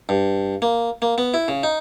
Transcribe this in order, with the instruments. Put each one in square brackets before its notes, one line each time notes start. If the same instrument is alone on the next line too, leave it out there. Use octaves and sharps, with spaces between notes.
[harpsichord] G2
A#3
A#3
B3
E4
C#3
D#4